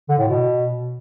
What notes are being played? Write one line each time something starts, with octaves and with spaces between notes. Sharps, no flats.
D3
A2
B2